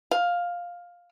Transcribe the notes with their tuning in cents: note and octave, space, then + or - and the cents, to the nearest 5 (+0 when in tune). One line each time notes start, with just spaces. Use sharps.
F5 +10